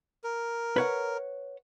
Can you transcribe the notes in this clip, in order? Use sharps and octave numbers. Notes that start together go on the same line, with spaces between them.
A#4
B4 C#5 F#5